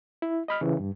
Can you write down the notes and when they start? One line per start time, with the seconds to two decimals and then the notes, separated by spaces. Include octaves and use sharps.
0.22 E4
0.48 D#5 B5 F6
0.61 C#3 E3
0.80 G2